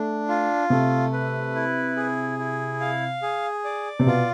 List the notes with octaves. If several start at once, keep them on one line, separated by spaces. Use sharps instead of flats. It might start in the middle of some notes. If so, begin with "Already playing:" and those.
Already playing: A3 D4
F4
C3 A3
B4
E4
G#4
E4
F5
G#4
D5
C3
B2 F4